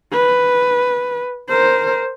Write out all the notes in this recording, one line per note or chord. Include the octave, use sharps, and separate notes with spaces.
B4
A#4 C5